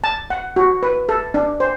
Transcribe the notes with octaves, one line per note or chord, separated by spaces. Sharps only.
A5
F#5
F#4
B4
A4
D4
C5